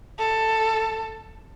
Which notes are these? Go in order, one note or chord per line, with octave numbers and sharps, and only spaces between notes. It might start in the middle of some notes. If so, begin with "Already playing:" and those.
A4